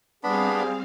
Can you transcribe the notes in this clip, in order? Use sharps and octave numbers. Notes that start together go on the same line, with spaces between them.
G3 B3 C4 D4 G#4 F5 B5